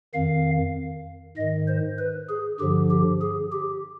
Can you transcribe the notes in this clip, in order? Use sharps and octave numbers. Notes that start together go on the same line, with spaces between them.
F2 D#3 F5
G#2 D#3 D#5
C5
B4
G#4
G2 D3 F3 G4
G4
G#4
G4